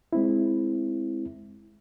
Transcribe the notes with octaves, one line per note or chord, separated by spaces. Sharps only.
G#3 C4 E4